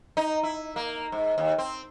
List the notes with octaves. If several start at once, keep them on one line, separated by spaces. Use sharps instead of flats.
D#4
E4
A#3
G#2
D#2
C4